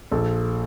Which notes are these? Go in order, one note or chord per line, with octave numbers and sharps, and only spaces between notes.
A#1 A#2 A4